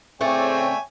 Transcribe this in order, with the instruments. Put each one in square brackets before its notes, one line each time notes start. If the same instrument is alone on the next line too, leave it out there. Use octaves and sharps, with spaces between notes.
[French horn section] A2 C#3 C4 [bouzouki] A3 D5 [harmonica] C#5 G5 G#5